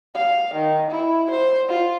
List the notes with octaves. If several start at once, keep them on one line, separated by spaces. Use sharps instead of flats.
F5
D#3
E4
C5
F4